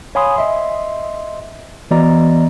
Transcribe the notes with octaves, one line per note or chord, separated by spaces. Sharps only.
C#5 F5 G#5 B5 C6 D#6
D#5 E5 C6
E3 B3 F#4 D5 D#5 A#5